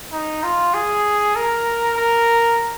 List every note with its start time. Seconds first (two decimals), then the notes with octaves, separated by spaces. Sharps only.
0.12 D#4
0.43 F4
0.74 G#4
1.36 A#4
1.97 A#4